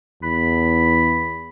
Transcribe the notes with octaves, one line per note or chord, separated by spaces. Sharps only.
E2 B5